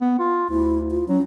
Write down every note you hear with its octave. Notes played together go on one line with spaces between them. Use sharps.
B3
F4
D2 E4
F4
F#3 C#4